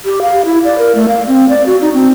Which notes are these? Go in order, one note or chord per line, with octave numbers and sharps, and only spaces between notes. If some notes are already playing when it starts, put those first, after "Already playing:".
G4
F5
E4
D5
A#4
A3
F5
C4
D5
F#4
D#4
C4